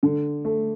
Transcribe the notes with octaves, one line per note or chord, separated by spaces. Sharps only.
D3
A3